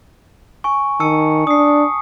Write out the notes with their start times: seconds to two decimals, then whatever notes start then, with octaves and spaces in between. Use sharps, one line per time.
0.64 G#5 C#6
1.00 D#3 A5 E6 C#7
1.47 D4 D#6 C7